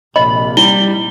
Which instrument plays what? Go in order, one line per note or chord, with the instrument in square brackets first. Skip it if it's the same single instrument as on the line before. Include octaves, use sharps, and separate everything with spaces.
[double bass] A#1 C3 [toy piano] D#5 [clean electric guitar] B5
[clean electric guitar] G3 [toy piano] E4 [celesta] G7